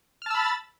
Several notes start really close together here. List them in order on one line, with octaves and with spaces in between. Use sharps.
F6 A5 E6 B5 A6